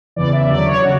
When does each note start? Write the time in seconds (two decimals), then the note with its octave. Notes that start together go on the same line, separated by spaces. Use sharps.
0.16 E2 C#3 E3 D5
0.33 E5
0.49 E2 D3 F#3 D5
0.66 C#5
0.82 C#3 F#4